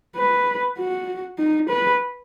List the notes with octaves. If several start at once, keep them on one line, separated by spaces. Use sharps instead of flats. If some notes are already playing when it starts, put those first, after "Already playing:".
B4
F#4
D#4
B4